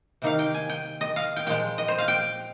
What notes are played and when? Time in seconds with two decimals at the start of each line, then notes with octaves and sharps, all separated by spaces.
0.22 C3 D#3 A#3 D#4 F5
0.39 G5
0.54 G#5
0.70 G5
1.01 D#5
1.16 F5
1.36 G5
1.46 A#2 F3 G#3 G5
1.78 D#5
1.88 C5
1.98 F5
2.08 G5